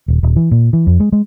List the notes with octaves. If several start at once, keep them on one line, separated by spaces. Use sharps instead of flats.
D#1
D#1
E3
A#2
E3
F2
G#3
G#3